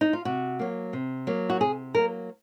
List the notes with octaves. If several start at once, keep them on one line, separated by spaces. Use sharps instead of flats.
D#4
F4
C3 F#4
F#3 A#3
C3
F#3 A#3
F#4
C3 G#4
F#3 A#3 A#4